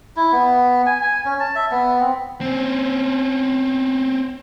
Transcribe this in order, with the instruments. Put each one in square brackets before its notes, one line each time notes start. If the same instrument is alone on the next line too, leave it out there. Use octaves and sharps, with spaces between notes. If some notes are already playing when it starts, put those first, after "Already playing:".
[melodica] E4
B3
G#5
G#5
C#4
A5
E5
B3
C4
[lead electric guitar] C4 C#4